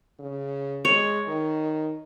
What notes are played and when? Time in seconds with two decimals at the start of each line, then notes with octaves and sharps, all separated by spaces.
0.20 C#3
0.85 G#3 C#5
1.28 D#3